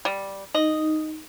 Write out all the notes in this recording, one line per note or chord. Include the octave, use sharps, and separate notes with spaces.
G3
D#4 D#5